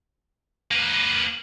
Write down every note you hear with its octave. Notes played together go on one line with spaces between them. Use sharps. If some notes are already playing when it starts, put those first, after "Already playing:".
A#3 B4